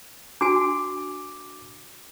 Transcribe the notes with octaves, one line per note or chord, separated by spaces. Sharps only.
D4 F#4 G#5 D6